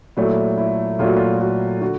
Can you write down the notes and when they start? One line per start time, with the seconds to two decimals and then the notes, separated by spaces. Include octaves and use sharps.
0.17 A#2 F#3 A3 E4
0.58 E4
0.99 A#2 F#3 A3 F4
1.08 F#4
1.17 F4
1.41 F#4
1.81 D3 F#4